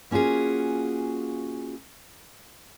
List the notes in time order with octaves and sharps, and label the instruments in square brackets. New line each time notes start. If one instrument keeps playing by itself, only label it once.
[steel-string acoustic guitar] A#3 C#4 F4 F#4 G#4